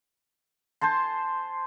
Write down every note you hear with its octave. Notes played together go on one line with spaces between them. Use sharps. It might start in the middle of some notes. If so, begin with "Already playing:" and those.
C5 G#5 A5 C6